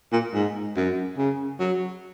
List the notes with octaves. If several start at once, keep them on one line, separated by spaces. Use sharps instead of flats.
A#2
G#2
F#2
C#3
F#3